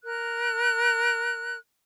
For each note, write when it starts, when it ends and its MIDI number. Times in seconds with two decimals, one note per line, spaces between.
0.04 1.56 70
0.04 1.56 90